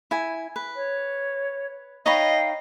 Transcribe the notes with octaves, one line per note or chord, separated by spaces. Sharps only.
E4 G#5
B4
C#5
D#4 C#5 D#5 F5 G5 B5